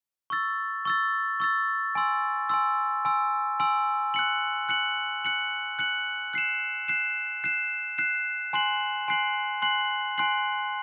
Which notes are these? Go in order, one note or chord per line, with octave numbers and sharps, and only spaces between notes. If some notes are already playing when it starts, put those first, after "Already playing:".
C#6 E6 A6
C#6 E6 A6
C#6 E6 A6
G#5 C6 E6
G#5 C6 E6
G#5 C6 E6
G#5 C6 E6
F#6 C#7 F#7
F#6 C#7 F#7
F#6 C#7 F#7
F#6 C#7 F#7
F#6 C7 E7
F#6 C7 E7
F#6 C7 E7
F#6 C7 E7
G#5 C6 F#6 C7 F#7
G#5 C6 F#6 C7 F#7
G#5 C6 F#6 C7 F#7
G#5 C6 F#6 C7 F#7